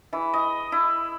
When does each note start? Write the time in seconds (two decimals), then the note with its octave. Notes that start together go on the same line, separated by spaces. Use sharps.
0.13 E3
0.34 D#5
0.72 E4